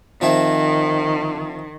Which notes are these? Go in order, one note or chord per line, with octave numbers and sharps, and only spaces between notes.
D#3 F3 C4 E5